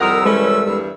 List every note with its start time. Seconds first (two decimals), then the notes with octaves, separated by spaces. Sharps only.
0.01 C2 F2 D#3 G3 A#4 F#5 D#6 E6
0.25 E3 G#3 A3 C#4 A4 B4
0.67 E2 G2